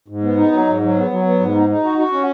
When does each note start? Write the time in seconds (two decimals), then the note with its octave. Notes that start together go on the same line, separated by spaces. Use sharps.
0.08 G#2
0.23 B3
0.38 D#4
0.52 F#3
0.67 G#2
0.82 F#3
0.96 B3
1.10 F#3
1.25 B3
1.40 G#2
1.55 D#4
1.69 D#4
1.84 F#4
1.98 F#4
2.12 C#4